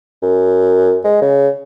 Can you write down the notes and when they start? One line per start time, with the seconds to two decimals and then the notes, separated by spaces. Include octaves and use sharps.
0.22 F#2
1.04 G#3
1.22 C#3